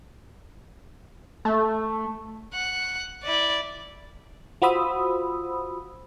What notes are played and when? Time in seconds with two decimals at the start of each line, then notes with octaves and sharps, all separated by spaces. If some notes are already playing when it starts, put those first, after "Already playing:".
1.45 A3
2.54 F#5
3.24 E4 D5
4.62 F4 F#4 C5 B5 D#6 E6